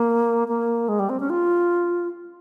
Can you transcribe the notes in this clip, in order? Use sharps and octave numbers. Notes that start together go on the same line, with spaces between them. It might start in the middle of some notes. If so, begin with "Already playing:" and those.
Already playing: A#3
A#3
G#3
G3
C4
C#4
F4